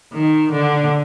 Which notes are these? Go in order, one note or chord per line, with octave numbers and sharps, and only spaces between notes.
D#3
D3